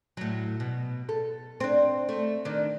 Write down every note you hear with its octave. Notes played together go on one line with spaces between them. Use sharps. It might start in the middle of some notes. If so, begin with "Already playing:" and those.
A2 F#3
B2
A4
C4 D4
A3
D#3 D4